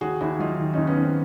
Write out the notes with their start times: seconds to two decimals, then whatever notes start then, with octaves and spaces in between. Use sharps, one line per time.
0.01 D#2 F#4 G#4
0.21 D#2 E4 F#4
0.39 F#3 D#4 F4
0.59 D#3
0.73 D#2 C#4 D#4
0.87 B3 C#4
0.97 D#2
1.02 C4